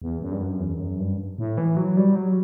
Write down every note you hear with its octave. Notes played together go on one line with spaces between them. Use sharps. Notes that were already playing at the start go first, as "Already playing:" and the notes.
E2
F#2
G2
F#2
E2
F#2
G2
A2
E3
F#3
G3
F#3